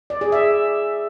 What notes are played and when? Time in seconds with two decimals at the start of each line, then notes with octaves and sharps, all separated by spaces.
0.10 D5
0.21 G#4
0.32 E5